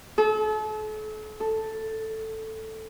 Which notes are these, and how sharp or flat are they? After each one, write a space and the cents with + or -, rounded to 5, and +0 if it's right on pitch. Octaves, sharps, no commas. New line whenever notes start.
A4 -40
A4 +5